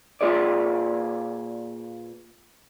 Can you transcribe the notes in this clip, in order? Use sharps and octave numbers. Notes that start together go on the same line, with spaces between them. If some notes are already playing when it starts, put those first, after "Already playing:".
A#2 A#3 F4 G#4 B4 D5